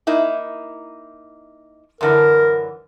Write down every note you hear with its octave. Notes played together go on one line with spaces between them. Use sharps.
A#3 D#4 E4
F#2 D3 E3 A#4